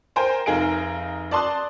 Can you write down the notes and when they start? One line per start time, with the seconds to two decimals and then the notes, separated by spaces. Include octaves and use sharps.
0.16 A#4 C5 G5 G#5
0.46 F1 D#4 G#4 F5 D7
1.31 D5 A5 C6 D#6 F#6